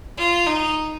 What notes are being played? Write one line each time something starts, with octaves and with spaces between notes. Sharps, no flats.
F4
D#4